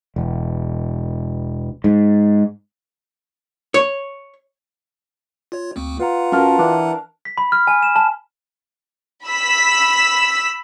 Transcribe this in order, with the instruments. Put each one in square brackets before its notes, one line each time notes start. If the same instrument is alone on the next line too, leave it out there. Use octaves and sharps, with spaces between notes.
[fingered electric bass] E1
G#2
[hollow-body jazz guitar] C#5
[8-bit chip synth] F4 C#5
D2 A#3 C4
[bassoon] F4 [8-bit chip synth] B4 F#5 A#5
[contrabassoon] F#2 [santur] A#4 F5 A5
[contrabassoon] E3 [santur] D4
[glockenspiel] B6
B5
F6
G#5
E7
A5
[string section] B5 E6 B6